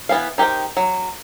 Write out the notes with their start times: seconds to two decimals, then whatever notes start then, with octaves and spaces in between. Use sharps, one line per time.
0.09 E3 B3 C#4 F5
0.38 D#4 G4 A#4 C5 G5
0.77 F#3